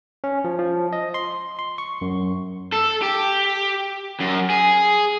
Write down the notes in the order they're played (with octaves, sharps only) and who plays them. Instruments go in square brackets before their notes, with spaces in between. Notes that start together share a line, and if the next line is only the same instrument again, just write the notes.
[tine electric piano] C#4
F3
F3
D#5
C6
C6
C#6
F#2
[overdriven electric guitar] A4
G4
F#2
G#4